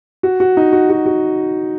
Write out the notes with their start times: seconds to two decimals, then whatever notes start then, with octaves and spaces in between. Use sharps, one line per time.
0.23 F#4
0.40 F#4
0.57 D#4
0.73 F#4
0.90 F#4
1.06 F#4